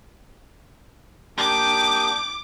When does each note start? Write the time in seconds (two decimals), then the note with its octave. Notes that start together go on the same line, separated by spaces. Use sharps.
1.38 A#3 D4 G4 G5 D6 D#6